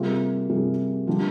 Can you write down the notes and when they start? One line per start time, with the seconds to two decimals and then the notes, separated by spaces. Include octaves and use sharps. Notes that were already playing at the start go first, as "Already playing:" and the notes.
Already playing: C3 G3 A#3 F4 G#4
0.49 C3 G3 A#3 F4 G#4
1.07 D3 G3 A#3 F4